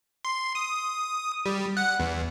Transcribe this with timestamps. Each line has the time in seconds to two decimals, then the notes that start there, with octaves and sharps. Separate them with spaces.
0.25 C6
0.55 D#6
1.46 G3
1.77 F#5
2.00 E2